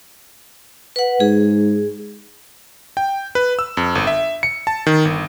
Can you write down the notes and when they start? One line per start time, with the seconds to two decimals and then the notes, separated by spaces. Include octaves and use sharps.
0.96 B4 F#5
1.20 G#2 G#4
2.97 G5
3.35 B4
3.59 E6
3.77 F2
3.95 G1
4.07 E5
4.43 C#7
4.67 A5
4.87 D#3
5.05 G1